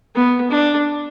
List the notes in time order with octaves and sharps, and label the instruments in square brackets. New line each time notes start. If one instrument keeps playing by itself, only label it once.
[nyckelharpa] B3
D4